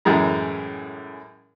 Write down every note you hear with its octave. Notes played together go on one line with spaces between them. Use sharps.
F#2 A2 E3 G#3 A#4 A#5